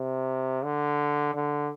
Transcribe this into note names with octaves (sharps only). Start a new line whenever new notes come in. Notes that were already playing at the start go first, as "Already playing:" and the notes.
Already playing: C3
D3
D3